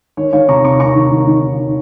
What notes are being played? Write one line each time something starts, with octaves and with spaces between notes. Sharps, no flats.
D#3 C#5
D#3 C#5 F5
C3 A#5 C#6
C3 A#5 C#6
D#3 A#5 C#6
D#3
D#3
D#3